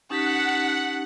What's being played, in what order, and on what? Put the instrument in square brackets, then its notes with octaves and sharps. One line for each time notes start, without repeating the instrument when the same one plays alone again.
[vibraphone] C#4 D#4 G4 [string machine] F#5 [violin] A5 B6